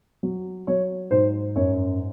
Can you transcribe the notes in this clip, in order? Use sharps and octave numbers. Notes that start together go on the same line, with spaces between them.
F#3
F#3 C#5
G#2 C5
F#2 C#5